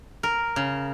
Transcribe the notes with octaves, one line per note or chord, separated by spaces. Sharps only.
A#4
C#3